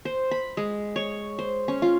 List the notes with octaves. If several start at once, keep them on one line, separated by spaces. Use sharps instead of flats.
C5
B5
G#3
C#5
C5
C#4
F4